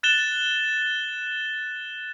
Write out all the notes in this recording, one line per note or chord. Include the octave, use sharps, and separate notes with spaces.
F#6 A6 E7 G7